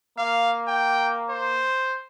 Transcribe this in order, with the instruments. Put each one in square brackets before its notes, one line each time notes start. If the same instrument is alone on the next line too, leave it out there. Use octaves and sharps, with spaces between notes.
[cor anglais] A#3 [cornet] F5
[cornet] G5
C5